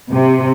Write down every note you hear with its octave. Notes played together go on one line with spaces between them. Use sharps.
C3